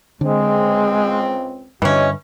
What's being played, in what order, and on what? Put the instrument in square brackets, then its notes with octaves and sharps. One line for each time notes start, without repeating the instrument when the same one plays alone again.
[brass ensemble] C#2 C4 [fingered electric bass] D3 [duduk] G#3
[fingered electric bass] G2 D3 [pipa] E3 C#4 [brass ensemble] F#4 C#5 D#5